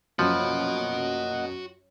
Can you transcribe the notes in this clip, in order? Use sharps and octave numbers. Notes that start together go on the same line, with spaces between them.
F#2 F3 A#3 F#4 D#5 F#5 B5